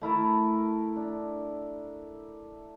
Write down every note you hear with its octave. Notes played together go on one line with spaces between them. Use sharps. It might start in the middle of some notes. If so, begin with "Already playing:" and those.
A3 E4 A#4 A5
D4